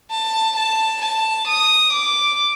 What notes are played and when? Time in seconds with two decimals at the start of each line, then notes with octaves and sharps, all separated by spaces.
0.11 A5
0.56 A5
1.02 A5
1.48 D#6
1.93 D6